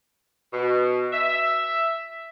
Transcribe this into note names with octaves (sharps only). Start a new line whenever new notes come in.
B2
E5